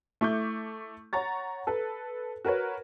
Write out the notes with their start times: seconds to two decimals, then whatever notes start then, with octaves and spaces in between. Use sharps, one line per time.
0.21 A3 E4 C#6 D6 G6
1.13 C#5 F#5 A#5 C#6 A6
1.67 A4 B4
2.45 F#4 A#4 B4 C#5